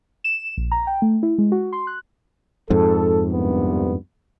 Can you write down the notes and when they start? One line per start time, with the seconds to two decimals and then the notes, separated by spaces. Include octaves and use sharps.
0.24 E7
0.57 A#1
0.72 A#5
0.87 G5
1.02 A3
1.23 E4
1.38 G#3
1.52 F#4
1.73 C6
1.87 F#6
2.70 F2 G#2 A4
3.31 C2 G2 B3